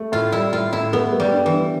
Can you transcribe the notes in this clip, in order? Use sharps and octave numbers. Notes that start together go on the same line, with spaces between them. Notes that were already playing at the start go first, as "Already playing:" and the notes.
Already playing: A3
A2 F4
G3 E4
A2 F4
A2 E4
A3 B3
A3
G3
G2
E3
G2